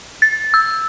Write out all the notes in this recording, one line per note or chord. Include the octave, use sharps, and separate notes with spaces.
A6
E6